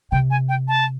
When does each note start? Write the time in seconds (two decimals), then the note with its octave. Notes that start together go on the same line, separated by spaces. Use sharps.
0.11 C3 G5
0.30 G#5
0.49 G5
0.68 A5